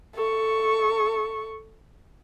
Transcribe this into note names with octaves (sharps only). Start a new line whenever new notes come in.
A4 C#6